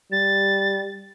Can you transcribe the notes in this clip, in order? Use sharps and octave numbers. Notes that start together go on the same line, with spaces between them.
G3 A6